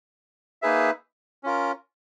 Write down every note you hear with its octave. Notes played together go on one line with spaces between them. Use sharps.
A#3 D#4 G#4 B4 E5
C#4 F4 A#4